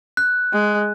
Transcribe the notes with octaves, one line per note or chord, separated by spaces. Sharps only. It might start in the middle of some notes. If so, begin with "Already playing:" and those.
F#6
G#3